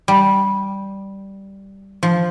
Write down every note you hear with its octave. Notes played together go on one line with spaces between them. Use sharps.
G3
F3